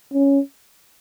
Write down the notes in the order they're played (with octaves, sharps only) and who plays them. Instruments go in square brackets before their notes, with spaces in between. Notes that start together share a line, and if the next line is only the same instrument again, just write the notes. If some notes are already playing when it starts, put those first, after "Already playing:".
[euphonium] C#4